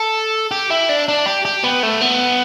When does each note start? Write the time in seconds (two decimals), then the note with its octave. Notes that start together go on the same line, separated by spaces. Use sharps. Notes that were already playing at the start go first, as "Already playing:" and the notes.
Already playing: A4
0.51 G4
0.70 E4
0.89 D4
1.08 D4
1.26 G4
1.45 G4
1.64 B3
1.83 A3
2.01 B3